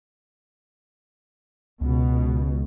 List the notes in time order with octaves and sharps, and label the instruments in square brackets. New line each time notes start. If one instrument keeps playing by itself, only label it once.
[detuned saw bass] C#2 [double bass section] B2